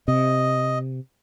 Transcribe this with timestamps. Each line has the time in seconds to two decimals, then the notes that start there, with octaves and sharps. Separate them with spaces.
0.08 C3 D#5